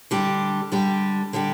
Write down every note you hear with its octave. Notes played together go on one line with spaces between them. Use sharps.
D3 G3 D4 G4
D3 G3 D4 G4
D3 G3 D4 G4